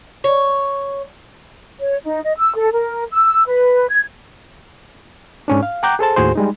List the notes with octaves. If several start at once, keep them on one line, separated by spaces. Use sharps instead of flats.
C#5
C#5
D#4
D#5
E6
A4
A#4
E6
B4
G#6
G#2 C#4 D4
F5
F#5 G5 A#5 D6 F#6 G6
G#4 A4 C5 A5
D#2 A2 F#4 G#4 C5
G3 G#3 D#4